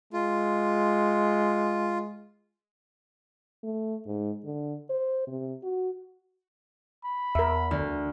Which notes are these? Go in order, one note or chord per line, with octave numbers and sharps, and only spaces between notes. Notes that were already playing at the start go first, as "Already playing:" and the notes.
G#3 F4
A3
G#2
D3
C5
C3
F#4
B5
E2 A#4 E5
D2